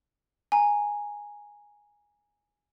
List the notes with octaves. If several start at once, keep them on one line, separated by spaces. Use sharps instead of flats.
G#5 A#5